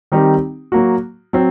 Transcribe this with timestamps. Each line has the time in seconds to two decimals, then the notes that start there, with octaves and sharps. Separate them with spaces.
0.12 D#3 G3 C4 D#4 G4
0.72 F#3 A#3 F#4
1.33 F#3 C4